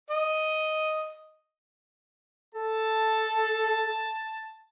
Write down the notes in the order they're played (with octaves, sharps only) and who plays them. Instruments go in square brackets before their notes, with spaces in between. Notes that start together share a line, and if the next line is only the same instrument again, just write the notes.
[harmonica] D#5
[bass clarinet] A4 [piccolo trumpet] A5